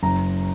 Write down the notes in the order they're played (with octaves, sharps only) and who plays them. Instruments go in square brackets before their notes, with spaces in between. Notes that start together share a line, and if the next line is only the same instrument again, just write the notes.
[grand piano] F#1 A#5